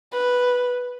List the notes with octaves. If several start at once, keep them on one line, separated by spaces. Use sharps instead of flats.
B4